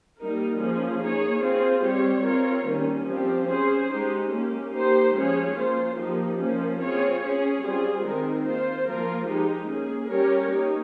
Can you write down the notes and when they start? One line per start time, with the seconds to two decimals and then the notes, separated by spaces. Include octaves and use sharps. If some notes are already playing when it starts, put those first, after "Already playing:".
0.20 G3 A#3 D#4 A#4
0.61 F3 A#3 C#4 G#4
1.02 A#3 D#4 G#4 C#5
1.44 C4 F4 G#4 C5
1.84 G3 C4 G4 C#5
2.26 C4 F4 A#4 C#5
2.68 D#3 G3 A#3 C#4
3.09 F3 C4 G4
3.50 C#4 G#4 C5
3.92 G#3 D#4 G4
4.33 A#3 C#4 G4
4.74 A#3 D#4 G4 C5
5.16 F3 G#3 C#4 G#4 C#5
5.57 A#3 F4 C5
5.97 F3 A#3 D#4 G4
6.40 F3 A#3 C#4
6.80 C4 F4 G#4 C#5
7.22 C#4 G#4 C#5
7.62 G3 C4 F4 G#4
8.04 D#3 G#3 C4 D#4 A#4
8.46 A#3 F4 C5
8.87 F3 A#3 F4 A#4
9.28 G#3 D#4 G4
9.70 A#3 C#4 G#4
10.11 G3 C#4 G4 A#4 C#5
10.52 A#3 D#4